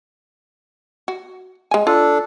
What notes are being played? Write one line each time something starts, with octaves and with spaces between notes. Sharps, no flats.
F#4
G#3 G#5
D4 F4 A4